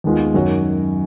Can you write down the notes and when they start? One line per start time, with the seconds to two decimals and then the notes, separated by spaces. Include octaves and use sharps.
0.04 D#2 D#3 G#3 B3 F4
0.34 F#2 D#3 F#3 C#4 F#4